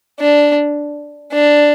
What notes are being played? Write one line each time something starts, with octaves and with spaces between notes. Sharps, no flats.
D4
D4